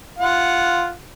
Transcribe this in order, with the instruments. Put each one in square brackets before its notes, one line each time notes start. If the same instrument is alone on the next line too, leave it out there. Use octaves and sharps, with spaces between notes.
[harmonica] F4 F#5